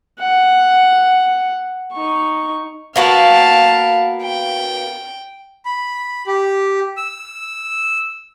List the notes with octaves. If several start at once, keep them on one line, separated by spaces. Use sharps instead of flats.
F#5
D#4 C#6
A#3 B3 F#4 F5 A5
G5
B5
G4
E6